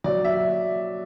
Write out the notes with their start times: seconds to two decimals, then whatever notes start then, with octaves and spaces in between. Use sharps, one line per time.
0.04 F#3 D5
0.24 E5